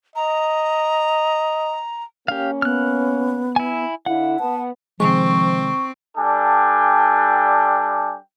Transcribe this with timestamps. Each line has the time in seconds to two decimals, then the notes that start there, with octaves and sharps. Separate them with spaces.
0.16 D#5 A#5
2.28 A#3 C#4 G4 F5
2.62 B3 F6 F#6
3.56 E4 G#5
4.06 D3 E4 F5 F#5
4.40 B3 A5
5.00 C3 D#3 F3 G#3 C4 C#6
6.17 G3 D4 A4 G5 G#5